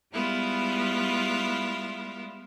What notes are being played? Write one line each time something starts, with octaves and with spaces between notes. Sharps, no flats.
G3 G#3 B3 E4 F4